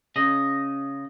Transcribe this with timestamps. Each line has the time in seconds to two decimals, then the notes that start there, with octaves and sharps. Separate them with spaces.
0.16 C#3 D#5